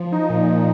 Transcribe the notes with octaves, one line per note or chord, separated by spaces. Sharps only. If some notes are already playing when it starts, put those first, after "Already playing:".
Already playing: F3
D#4
A#2
A#2